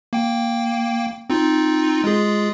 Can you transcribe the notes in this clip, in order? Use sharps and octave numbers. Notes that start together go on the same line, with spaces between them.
A#3 G5
C4 D#4 F4
G#3 F4 G#4